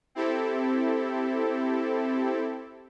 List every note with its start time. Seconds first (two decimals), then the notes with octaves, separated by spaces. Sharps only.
0.15 C4 E4 G4 A4